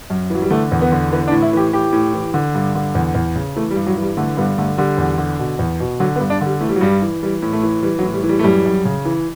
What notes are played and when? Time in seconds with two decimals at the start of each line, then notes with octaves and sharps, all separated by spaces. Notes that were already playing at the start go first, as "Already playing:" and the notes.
0.10 F#2
0.30 E3 F#3
0.42 G3
0.50 D3 A3
0.72 E2
0.81 B3
0.92 D3
1.12 E3 B3
1.28 D4
1.32 A2
1.42 E4
1.53 E3 G4
1.73 E3 G4
1.93 A2
2.13 E3
2.34 D3
2.54 G2
2.75 D3
2.95 E2
3.15 E2
3.36 C#3
3.56 E3 A3
3.71 G3
3.76 G2
3.87 F#3
3.97 E3 G3
4.17 D3 A3
4.37 G2 B3
4.58 D3 A3
4.78 D3 G3
4.98 E2
5.18 D3
5.39 B2
5.59 E2
5.80 B2
6.00 D3 F#3
6.16 B3
6.20 G2
6.30 D4
6.41 D3
6.46 G3
6.61 E3 A3
6.69 G3
6.76 F#3
6.81 G2 G3
7.02 E3
7.23 E3 G3
7.42 A2
7.53 A3
7.63 E3
7.83 E3 G3
7.99 F#3
8.03 A2
8.14 G3
8.24 E3
8.29 G3
8.39 A3
8.44 F#2 G3
8.65 F#2
8.85 C#3
9.05 E3